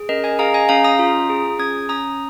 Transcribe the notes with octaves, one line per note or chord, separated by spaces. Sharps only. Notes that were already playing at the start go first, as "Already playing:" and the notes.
Already playing: G#4
C#4 A#4 D#5
D#5 G#5
G#4 F5 A#5
D#5 G#5
C#4 F5 A#5
A#5 D#6
F4
G#4
C#4 D#6 G#6
C#4 A#5 D#6